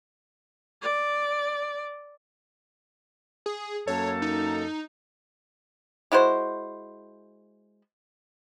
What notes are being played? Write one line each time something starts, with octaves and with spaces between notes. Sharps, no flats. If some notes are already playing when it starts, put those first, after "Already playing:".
D5
G#4
F#2 A#3 A4 C#5
D#4
G#3 E4 F#4 C5